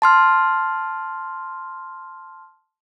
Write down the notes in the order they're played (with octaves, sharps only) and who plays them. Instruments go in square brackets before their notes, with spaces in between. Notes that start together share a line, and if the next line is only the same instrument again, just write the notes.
[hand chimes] A5 C6 F6